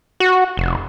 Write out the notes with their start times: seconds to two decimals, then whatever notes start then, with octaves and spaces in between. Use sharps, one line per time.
0.20 F#4
0.57 F1